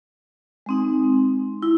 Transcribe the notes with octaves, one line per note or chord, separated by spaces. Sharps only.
G#3 C4 D#4
E4